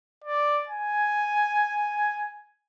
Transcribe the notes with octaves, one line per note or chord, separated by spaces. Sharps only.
D5
G#5